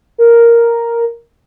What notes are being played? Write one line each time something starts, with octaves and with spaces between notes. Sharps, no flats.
A#4